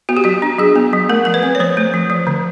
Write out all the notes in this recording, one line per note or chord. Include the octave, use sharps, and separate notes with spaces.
B3 F#4
G4
F#3 F#4
D4
F#3 G#4
B3
F#3
A3 A#4
F3 A#4
B4
C4
C#5
F3 C5
A3
F3
F3
D3